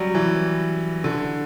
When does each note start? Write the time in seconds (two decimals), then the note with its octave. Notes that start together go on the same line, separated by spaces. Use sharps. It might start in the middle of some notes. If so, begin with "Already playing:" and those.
Already playing: F#3 G3
0.15 E3
1.04 D3